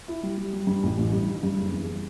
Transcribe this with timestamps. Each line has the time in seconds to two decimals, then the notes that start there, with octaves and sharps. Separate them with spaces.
0.08 E4
0.23 G3
0.37 G3
0.53 G3
0.67 G2
0.83 A1
0.98 A1
1.12 G2
1.27 D#3
1.43 G2
1.58 F#1
1.72 E2